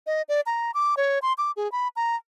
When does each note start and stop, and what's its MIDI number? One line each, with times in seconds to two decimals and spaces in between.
0.07 0.22 75
0.29 0.41 74
0.46 0.71 82
0.74 0.95 86
0.97 1.19 73
1.22 1.33 84
1.38 1.51 86
1.56 1.70 68
1.72 1.88 83
1.96 2.16 82